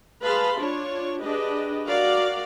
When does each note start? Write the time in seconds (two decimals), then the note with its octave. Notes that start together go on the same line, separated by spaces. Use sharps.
0.23 G#4 B4 F5 A5 B5 C6
0.59 D4 F4 C#5
1.21 D4 G4 G#4 B4 D#5
1.87 F#4 A#4 D5 F5